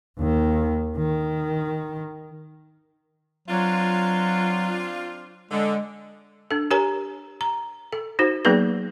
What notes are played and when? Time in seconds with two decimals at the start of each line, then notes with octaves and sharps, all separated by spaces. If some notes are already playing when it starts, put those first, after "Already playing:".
0.18 D#2 D#3
0.97 D#3
3.48 F#3 C4 D4 F4
5.51 D3 G#3
6.51 D4 A4
6.71 G4 A#4 C#5 G#5 A#5
7.41 A#5
7.93 A4
8.19 D#4 F#4 C5
8.45 F#3 A#3 B3 D#4 G#4 B4